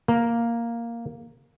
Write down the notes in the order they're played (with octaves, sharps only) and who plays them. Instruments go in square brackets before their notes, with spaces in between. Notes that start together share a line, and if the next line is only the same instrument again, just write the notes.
[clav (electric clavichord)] A#3